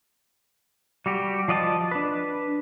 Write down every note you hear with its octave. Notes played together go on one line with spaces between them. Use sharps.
G3 F#4 G4
F3 D5 D#5 F5 A5
D4 B4